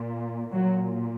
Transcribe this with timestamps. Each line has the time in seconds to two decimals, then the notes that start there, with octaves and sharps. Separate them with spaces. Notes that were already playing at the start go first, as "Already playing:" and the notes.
Already playing: A#2
0.53 A#2 F#3